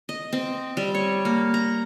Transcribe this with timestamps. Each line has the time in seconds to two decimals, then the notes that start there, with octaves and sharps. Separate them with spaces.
0.09 D#5
0.33 C4
0.77 G3
0.95 C#5
1.25 A#3
1.54 A#5